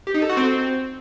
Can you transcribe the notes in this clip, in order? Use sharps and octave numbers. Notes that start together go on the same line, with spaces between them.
G4
D#4
A4
F#4
C4